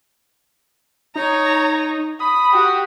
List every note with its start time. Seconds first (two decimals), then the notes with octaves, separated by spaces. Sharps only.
1.16 D#4 C#5 A#5
2.20 B5 D#6
2.51 F#4 G4